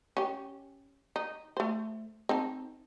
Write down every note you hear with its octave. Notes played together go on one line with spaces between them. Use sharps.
C#4 G4
D#4
A3 C5
C4 D#4 A4